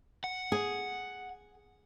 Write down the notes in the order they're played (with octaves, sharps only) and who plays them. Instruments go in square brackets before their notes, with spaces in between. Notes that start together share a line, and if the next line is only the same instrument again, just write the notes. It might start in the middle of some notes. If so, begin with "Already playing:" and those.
[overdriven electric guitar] F#5
[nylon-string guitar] G#4